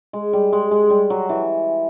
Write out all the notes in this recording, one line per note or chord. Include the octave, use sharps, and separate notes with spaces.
G#3
G3
G#3
G#3
G3
F#3
E3